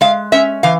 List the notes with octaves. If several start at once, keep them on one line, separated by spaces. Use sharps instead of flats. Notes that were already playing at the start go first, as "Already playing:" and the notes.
G#3 F5
C#4 E5
E3 F5